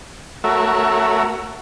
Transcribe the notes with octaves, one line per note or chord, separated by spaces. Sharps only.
A3 F#4 A#4 C#5 E5